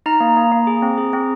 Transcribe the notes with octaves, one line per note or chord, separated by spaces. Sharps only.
D#4 A#5
A#3
A#3
A#3
G#4
C4
G#4
C4